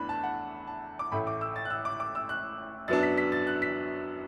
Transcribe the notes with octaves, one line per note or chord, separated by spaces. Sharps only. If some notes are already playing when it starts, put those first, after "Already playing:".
Already playing: E2 E3 A3 D4 B5 F#6
A5
F#5
A5
D6
A1 A2 A3 B5
D6
E6
A6
F#6
E6
D6
D6
E6
F#6
F#2 F#3 B3 D4 A6
B6
B6
A6
F#6
B6